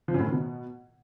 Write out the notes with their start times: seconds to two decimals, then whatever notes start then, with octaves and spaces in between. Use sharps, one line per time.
0.08 F3
0.14 F#2
0.20 A2
0.26 D#3
0.32 B2